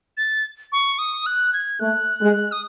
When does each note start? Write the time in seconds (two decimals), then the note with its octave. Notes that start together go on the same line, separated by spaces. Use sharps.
0.17 A6
0.72 C#6
0.99 D#6
1.26 F#6
1.53 G#6
1.80 A3 F#6
2.20 G#3
2.52 D#6